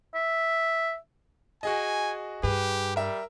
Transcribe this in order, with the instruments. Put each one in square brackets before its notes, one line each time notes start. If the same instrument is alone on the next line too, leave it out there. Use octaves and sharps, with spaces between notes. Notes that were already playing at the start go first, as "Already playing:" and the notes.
[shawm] E5
[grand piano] F#4 G#4 D#5 [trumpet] G#5
[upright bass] G2 [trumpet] G4 [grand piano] G#4 B4
[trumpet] G3 [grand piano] A#4 E5